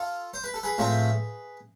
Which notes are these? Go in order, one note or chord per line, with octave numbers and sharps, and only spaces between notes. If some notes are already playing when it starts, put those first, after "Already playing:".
Already playing: F4 A4
C5
B4
A4
G#4 B4
A2 F3 A3 C4